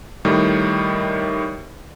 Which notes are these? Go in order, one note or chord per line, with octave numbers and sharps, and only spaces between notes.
A2 D#3 G3